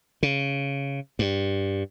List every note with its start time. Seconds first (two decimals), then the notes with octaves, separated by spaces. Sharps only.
0.23 C#3
1.19 G2